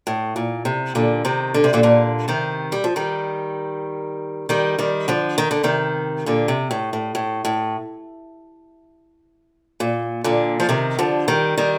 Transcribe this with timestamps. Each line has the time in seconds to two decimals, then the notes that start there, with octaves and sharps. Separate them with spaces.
0.07 A2
0.36 A#2
0.65 C3
0.95 A#2 D3
1.25 C3 D#3
1.54 D3
1.64 C3
1.73 A#2 D3
1.83 A#2 D3
2.28 C3 D#3
2.72 G3
2.84 F3
2.96 D#3 G3
4.49 D#3 G3
4.79 D#3 G3
5.08 D3 F3
5.38 D#3
5.51 D3
5.64 C3 D#3
6.26 A#2 D3
6.48 C3
6.71 A2
6.93 A2
7.15 A2
7.45 A2
9.80 A#2
10.24 A#2 D3
10.60 F3
10.69 C3 D#3
10.99 D3 F3
11.28 D#3 G3
11.58 D#3 G3